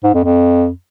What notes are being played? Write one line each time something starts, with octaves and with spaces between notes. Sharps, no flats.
G#2
F2
F2